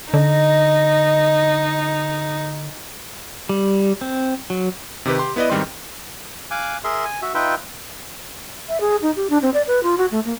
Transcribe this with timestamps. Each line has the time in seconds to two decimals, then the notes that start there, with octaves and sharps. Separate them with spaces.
0.14 D3 D#4 D#5
3.49 G3
4.01 C4
4.50 F#3
5.05 C3 D#3 G4 B4
5.19 G4 C6
5.36 B3 E4 B4 D5 D#5
5.50 G#2 D#3 G3 C4 B4 C6
6.51 F5 G#5 D6 F#6
6.84 G#4 A#4 E5 C6
7.05 G#5
7.22 F#4 E5
7.35 D#4 F4 B4 E5 G5
8.69 E5
8.80 G#4
9.02 D#4
9.16 G4
9.30 D4
9.42 C4
9.54 D5
9.67 B4
9.83 F4
9.98 F#4
10.11 A3
10.25 A#3